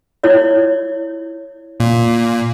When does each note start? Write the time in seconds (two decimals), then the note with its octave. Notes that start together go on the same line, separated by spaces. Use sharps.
0.23 E4 C#5 D5
1.80 A#2